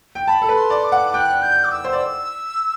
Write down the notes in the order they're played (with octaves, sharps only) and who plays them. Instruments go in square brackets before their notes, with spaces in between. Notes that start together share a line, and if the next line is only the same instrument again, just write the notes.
[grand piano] G5
[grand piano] A5 [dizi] B5
[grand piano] A4
B4
[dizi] C6
[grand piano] D5
[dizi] D6
[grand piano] F#5
[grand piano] G5 [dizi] F#6
[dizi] G6
D6
E6
[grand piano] C5
D5